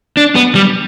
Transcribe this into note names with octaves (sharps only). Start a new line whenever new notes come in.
D4
B3
G3